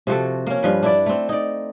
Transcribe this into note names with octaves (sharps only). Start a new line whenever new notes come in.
C3 F3 F#4 A4
A#3 C#4
G2 F3 B4
D4 E4 D5
A3 C4
D#4 D5